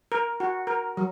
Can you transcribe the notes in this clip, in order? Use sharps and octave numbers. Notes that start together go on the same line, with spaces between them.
A#4
F#4
A#4
F#3